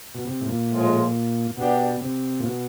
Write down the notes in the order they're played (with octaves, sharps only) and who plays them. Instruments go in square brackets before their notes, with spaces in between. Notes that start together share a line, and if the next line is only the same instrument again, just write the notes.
[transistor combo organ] B2
C3
A2
A#2
[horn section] A2 F3 G#3
[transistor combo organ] B2 [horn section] B3 D4 G4
[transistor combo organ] C3
A#2
B2